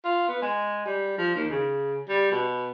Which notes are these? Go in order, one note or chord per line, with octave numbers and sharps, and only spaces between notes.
F4
B3
G#3
G3
F3
D#2
C#3
G3
B2